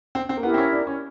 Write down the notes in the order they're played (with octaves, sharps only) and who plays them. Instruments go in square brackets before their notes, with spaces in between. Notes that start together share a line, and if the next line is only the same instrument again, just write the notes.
[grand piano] C4
C4
A#3
[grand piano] B3 [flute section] E4 G4 A#4
[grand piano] C4
C#4
D4
C#4